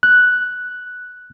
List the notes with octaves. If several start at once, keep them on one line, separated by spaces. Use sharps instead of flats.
F#6